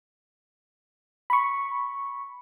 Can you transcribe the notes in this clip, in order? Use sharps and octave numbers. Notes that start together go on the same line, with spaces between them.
B5 C#6